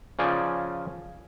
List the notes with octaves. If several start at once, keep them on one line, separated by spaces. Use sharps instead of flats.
C#3 F3 D5 G#5